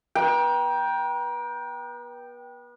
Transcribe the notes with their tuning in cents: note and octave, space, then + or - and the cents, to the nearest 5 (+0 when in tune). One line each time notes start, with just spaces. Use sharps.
B3 -35 G5 +0 A#5 +35